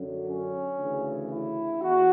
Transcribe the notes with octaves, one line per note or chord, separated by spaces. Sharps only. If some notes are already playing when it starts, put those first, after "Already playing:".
Already playing: F#2 D3 F#3
C#4
D2 C#3 E3
E4
E2 F#4